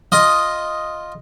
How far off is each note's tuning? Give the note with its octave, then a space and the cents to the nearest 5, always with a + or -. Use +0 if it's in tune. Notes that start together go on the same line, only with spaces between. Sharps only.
F4 +0 D#5 +0